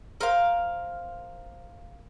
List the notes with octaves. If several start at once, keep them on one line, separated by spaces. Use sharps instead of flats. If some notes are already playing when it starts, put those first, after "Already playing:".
A#4 C5 F5